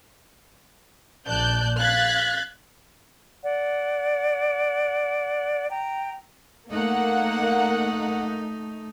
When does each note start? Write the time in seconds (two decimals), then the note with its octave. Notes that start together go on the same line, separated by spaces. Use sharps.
1.28 A#1 D5 A5 F#6 G6
1.78 F5 F#6 G#6 A6 B6
3.44 D5 F#5
5.70 G5 A#5
6.71 A3 A#3 D#4 F#5